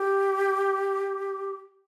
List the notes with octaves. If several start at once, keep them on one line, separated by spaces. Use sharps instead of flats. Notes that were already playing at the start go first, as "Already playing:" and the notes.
Already playing: G4